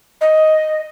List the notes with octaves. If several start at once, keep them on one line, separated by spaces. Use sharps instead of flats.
D#5